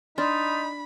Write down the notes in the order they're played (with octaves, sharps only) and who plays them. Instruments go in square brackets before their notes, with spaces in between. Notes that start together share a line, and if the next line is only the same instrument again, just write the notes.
[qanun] D4 [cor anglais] D#4 [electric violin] B5 [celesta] C6 F6 A6